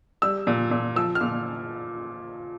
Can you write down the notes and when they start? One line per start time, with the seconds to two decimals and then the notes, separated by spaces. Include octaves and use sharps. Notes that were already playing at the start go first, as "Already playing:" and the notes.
0.22 G3 E6
0.47 A#2
0.71 A#2
0.96 F3 E6
1.15 F6
1.21 A#2